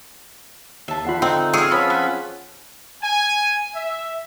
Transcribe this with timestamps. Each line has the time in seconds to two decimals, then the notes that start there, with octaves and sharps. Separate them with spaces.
0.88 D#2 E5 A5
1.05 E2 F4 F#5 B5 C7
1.22 D3 C4 D#4
1.53 C4 G#4 C#5 E6 F6
1.71 F3 B3 C#4 F4 B5
1.90 B3 B4 B5
3.03 G#5
3.75 E5